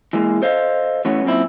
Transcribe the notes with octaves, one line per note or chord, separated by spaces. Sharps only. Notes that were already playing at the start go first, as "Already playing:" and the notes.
E3 G#3 A#3
A4 C5 D#5 F5
E3 A3 B3 C#4 F#4
F#2 A#2 C4 E4